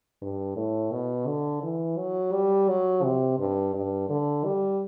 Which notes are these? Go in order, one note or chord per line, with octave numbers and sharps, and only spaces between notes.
G2
A2
B2
D3
E3
F#3
G3
F#3
C3
G2
G2
D3
G3